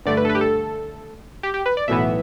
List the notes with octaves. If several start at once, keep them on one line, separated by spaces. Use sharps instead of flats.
G2 D3 A3 D5
B4
A4
B4
G4
A4
G4
G4
B4
D5
B1 A2 E3 B3 E5